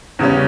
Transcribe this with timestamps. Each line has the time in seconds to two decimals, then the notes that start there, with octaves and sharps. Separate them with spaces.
0.19 E2 C#3 G3 C#4